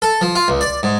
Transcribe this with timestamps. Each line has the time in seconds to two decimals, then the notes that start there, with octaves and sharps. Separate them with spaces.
0.02 A4
0.21 F3
0.35 F4
0.48 C#2
0.61 D5
0.83 G#2